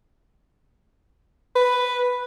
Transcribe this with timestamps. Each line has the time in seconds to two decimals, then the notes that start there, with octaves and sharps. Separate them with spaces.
1.56 B4